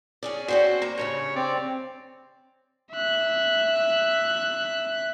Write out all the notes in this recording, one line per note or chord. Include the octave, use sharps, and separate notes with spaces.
C#4 G#4 D5
C4 C#4 F#4 C5 D5
A#3 A#5
G2 A#2 C#3 C#5
C4 D5
E5 F#6